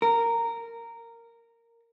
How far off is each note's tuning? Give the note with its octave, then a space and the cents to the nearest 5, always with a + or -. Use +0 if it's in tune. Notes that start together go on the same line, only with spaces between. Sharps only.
A#4 -10